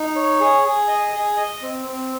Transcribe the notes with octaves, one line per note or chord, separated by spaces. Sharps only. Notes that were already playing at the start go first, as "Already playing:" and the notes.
Already playing: D#4
C#5
G#4
G#4
D#5
G#4
D#5
C4
C4